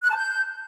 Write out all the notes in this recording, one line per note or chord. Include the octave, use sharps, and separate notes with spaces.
F#6
A5
G6